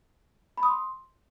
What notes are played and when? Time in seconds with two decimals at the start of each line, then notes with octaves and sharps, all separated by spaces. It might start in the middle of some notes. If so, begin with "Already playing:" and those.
0.57 B5
0.63 D#6
0.68 C6